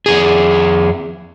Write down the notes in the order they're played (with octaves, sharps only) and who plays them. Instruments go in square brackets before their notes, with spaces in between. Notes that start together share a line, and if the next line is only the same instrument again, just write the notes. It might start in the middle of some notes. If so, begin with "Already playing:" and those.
[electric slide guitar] F2 B2 G#4